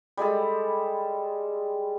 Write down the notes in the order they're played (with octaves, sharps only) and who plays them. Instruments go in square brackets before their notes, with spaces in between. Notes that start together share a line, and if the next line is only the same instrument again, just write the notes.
[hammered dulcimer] G3 G#3 G#4 A4